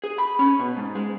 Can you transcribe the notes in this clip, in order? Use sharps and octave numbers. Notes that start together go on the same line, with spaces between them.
G#4
B5
C#4
B2
G#2
G#3